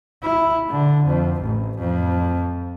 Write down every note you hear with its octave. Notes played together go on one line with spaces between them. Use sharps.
E4
D3
F2
A1
F2